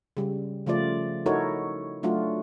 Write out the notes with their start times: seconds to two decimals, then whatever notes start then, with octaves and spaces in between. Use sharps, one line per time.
0.17 C#3 G3
0.66 C#3 F3 A3 F4 D5
1.26 D#4 E4 F#4 A4 A#4 C#5
2.03 F#3 A3 D4 F4 F#4